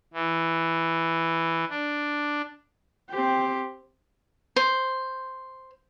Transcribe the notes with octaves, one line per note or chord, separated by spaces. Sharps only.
E3
D4
C4 G4
C5